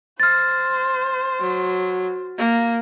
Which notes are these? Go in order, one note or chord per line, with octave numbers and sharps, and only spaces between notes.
C5 F6 A6
F#3
A#3